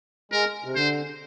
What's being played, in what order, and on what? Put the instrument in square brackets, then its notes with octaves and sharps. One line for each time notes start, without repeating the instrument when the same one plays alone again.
[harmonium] G#3 [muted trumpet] A#4
[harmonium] C3
[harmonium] D3 [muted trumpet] C5